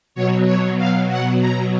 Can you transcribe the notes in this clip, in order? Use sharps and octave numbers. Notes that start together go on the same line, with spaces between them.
B2 F#3 C#5
C#5
F5
F#5
A#5